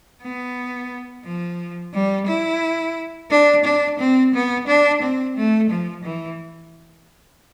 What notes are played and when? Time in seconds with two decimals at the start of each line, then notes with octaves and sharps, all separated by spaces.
0.23 B3
1.25 F3
1.94 G3
2.27 E4
3.30 D4
3.64 D4
3.99 C4
4.33 B3
4.67 D4
5.02 C4
5.36 A3
5.69 F3
6.03 E3